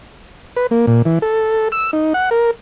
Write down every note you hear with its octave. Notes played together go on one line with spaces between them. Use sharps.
B4
A#3
A#2
E3
A4
E6
D#4
F#5
A#4